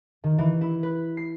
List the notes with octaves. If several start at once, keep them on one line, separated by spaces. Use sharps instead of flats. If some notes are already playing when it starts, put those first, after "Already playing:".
D#3
E3
E4
B4
C7